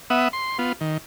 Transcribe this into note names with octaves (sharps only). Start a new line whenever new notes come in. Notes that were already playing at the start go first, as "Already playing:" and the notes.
B3 E5 F#5 D#6
C6
B3 F4
D#3